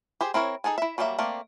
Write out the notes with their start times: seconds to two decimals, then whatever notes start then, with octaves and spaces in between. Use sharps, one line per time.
0.21 G4 G#4 C5
0.34 C4 E4 A#4 C#5
0.64 D#4 G#4 A4 G#5
0.78 E4 E5
0.98 F#3 G3 A#3 G#4 E5
1.18 A3 A#3 C4 D5